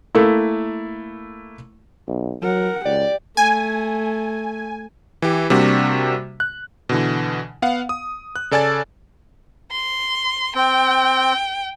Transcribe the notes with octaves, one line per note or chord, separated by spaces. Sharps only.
A3 A#3 E4
B1
F#3 A#4 F#5
C#2 G4 D5
A3 G#5
E3 G4
C3 G3 A#3 D4 F#4
F#6
B2 D3 E3
B3 F5 F#5
D#6
F#6
C#3 A4 D5 G#5 E6 A6
C6
C4 G5